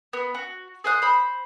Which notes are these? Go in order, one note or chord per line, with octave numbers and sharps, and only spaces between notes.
B3
F#4
G#4 C5 D#6 F#6
C5 B5